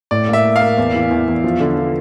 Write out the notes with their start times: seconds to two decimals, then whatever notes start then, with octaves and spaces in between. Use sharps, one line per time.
0.11 A2 D5
0.29 A#3 E5
0.44 A#3
0.56 F5
0.61 A#3
0.78 E2
0.94 E3
1.11 E2
1.28 E2
1.44 F3
1.60 D3
1.77 F3